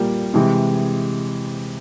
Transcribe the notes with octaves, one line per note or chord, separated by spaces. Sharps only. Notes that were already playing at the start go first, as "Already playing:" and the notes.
Already playing: A#2 G3 A#3 G5
C3 E3 G#3